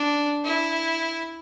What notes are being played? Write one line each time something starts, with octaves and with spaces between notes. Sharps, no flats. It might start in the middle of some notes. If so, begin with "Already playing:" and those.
Already playing: D4
E4